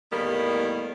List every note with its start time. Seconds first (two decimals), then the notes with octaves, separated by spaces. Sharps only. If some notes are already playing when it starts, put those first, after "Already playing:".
0.13 E2 A2 D#3 G3 A#3 B3